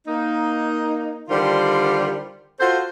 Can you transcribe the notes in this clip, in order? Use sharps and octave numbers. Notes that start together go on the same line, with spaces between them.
A#3 D#4
D3 D#3 G3 F4 A#4 C5
F4 F#4 A4 C5